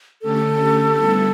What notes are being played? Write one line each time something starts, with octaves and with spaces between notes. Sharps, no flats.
D3 A3 C#4 G4 A4
D3 G3 B3 E4